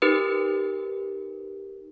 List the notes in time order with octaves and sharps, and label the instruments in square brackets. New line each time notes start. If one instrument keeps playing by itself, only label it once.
[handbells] D#4 G4 A#4 B4